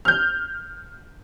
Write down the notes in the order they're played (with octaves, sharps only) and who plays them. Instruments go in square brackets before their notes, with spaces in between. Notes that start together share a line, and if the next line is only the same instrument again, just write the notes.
[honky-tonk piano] F6 G6